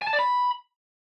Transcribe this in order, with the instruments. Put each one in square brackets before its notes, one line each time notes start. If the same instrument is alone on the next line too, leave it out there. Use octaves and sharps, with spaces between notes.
[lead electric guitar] G#5
A5
D5
B5